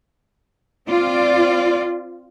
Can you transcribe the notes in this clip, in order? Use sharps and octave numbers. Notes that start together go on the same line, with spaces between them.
C4 F4 D5